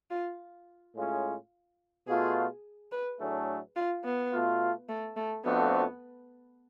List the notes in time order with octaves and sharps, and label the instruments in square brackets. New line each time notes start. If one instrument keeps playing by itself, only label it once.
[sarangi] F4
[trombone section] A2 G#3 C#4 F4 G#4
[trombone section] B2 A3 F4 [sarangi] G#4
[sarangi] B4
[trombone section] A2 F#3 A3 D4 G#4
[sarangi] F4
B3
[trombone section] B2 A3 F4
[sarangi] A3
A3
[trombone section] F2 F3 A3 D4 F#4 [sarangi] B3